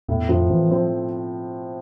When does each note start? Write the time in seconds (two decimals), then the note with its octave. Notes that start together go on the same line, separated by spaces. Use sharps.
0.08 E2 A2
0.29 F2 F3
0.50 E3 C4
0.70 F3 C4